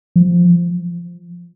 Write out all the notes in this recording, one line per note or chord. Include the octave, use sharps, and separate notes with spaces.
F3